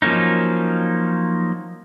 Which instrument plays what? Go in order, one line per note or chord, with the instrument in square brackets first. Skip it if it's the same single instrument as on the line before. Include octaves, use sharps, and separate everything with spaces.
[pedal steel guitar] F3 F#3 A#3 C#4 D#4